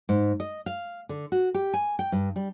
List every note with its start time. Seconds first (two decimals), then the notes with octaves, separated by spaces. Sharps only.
0.09 G#2
0.40 D#5
0.66 F5
1.09 D3
1.32 F#4
1.54 G4
1.74 G#5
1.99 G5
2.12 G2
2.36 G3